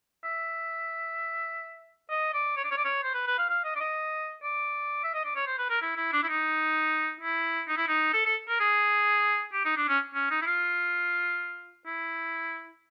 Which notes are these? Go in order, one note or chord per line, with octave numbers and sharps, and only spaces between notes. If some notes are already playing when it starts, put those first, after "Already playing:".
E5
D#5
D5
C#5
D5
C#5
D5
C#5
C5
B4
B4
F5
F5
D#5
D5
D#5
D5
E5
D#5
D5
C#5
C5
B4
A#4
E4
E4
D4
E4
D#4
E4
D#4
E4
D#4
A4
A4
A#4
G#4
G4
D#4
D4
C#4
C#4
D#4
E4
F4
E4